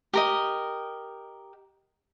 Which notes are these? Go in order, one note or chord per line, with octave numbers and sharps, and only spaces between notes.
G4 A#4 D#5